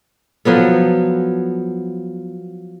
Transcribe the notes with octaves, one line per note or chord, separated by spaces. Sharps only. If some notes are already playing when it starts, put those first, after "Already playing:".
F3 F#3 B3 A4